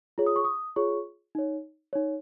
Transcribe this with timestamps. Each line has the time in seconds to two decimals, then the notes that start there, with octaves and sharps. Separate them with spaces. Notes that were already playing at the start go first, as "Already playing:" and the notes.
0.18 F4 G#4 C#5
0.27 D#6
0.36 C#6
0.44 D#6
0.76 F4 G#4 C#5 C#6
1.35 D#4 C#5
1.93 D#4 C#5